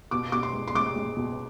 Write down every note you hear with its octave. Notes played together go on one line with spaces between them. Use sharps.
B2 D6
B2 D6
C6
G#3
C6
G#3 D6
G#3
B2